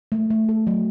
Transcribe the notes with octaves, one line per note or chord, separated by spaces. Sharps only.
A3
A3
A4
F#3